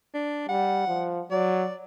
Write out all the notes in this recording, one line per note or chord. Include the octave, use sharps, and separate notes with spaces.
D4
G3 F#5
F3
F#3 D5